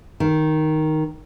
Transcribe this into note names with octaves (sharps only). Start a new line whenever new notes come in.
D#3